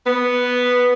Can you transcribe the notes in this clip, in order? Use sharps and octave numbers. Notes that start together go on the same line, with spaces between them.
B3